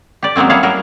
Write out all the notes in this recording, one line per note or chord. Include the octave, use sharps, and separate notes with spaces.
G4 D5
F#3 G#3 A#3 C4 C#4
F#3 G3 E4 G#4 C#5 F5
F#3 G3 A#4